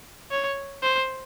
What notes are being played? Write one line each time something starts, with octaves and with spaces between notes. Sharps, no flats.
C#5
C5